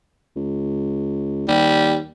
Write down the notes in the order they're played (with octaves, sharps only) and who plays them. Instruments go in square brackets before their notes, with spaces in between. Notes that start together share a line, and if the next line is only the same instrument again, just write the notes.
[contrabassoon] C#2
[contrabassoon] D#2 [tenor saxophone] G3